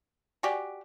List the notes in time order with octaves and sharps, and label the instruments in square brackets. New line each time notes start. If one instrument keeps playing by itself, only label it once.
[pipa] F#4 G4 [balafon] D5 G#5